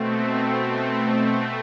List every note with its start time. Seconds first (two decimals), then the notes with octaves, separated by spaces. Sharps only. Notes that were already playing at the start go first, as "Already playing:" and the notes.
Already playing: B2 A3 C4
1.32 A3